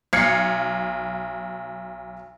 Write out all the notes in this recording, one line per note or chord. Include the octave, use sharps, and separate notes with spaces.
B1 F5 G#6 C7 C#7